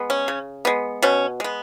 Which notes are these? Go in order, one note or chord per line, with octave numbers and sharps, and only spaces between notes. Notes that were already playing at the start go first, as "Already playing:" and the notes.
Already playing: G#3 B3
C#4
C#3
G#3 B3
B2 C#4
G#3 B3